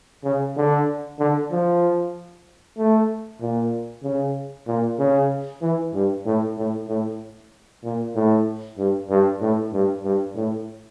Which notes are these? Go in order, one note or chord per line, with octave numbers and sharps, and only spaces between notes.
C#3
D3
D3
F3
A3
A#2
C#3
A#2
C#3
E3
G2
A2
A2
A2
A#2
A2
G2
G2
A2
G2
G2
A2